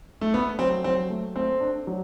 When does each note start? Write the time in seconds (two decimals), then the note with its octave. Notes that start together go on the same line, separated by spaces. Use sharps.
0.21 A3
0.34 A3 B3
0.59 F#3 C4
0.84 F#3 C4
1.10 A3
1.36 A3 C4
1.60 D4
1.87 F#3